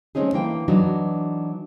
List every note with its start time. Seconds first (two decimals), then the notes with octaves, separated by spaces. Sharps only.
0.15 G#3 A3 C4 C#4 D#4 G#4
0.33 D3 E3 A#3 E4 G5
0.68 E3 F#3 D4 D#4 F#4